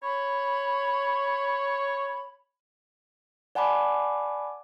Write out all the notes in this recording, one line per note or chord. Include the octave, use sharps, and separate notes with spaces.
C#5 B5
D5 F#5 G#5 A5 B5 D6